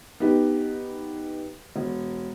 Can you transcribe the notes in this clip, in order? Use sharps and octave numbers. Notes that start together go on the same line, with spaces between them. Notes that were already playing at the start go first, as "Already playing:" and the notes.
B3 D#4 G4
E1